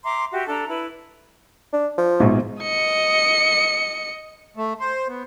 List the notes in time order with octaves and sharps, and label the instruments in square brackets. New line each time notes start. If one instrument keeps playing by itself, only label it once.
[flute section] E5 A#5 C6 D6
F#4 G4 E5
D4 A4 A#5
E4 B4
[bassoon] D4
F3
[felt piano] A#1 G#2 B2
[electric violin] D#5 C#7
[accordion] A3
C5
B3